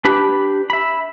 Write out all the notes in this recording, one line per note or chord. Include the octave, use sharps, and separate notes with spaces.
D4 G4 B4 B5
E5 B5